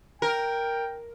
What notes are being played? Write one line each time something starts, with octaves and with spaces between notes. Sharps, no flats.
A#4 G5